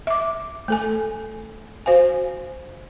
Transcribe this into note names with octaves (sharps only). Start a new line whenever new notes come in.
E5 D6
A3 A4 G#5
F#4 C5 F5 G#5